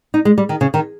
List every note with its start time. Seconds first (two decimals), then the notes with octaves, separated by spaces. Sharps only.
0.14 D#4
0.25 G#3
0.38 G3
0.49 D#3
0.61 C#3
0.74 D#3